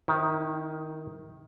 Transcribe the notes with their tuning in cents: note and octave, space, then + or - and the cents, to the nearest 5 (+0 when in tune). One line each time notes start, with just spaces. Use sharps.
D#3 +0 C4 +25 E4 -30